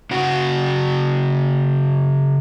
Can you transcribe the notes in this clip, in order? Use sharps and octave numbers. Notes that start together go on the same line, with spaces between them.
C#3 F#4 F#5